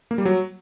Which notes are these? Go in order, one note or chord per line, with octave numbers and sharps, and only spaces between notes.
A#3
G3
F#3